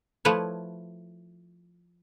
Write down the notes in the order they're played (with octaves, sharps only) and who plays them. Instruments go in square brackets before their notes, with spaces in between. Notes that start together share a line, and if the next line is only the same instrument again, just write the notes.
[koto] F3 A3 E4 B4 C#5